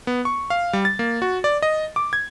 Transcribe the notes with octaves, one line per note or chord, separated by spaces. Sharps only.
B3
C#6
F5
G3
A6
A#3
F#4
D5
D#5
D6
G#6